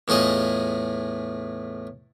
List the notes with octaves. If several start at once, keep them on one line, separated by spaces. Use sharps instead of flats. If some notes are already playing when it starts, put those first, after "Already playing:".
E2 A2 F4 G#4 D#5